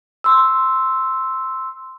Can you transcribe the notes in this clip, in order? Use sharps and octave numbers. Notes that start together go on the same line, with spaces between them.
C6 E6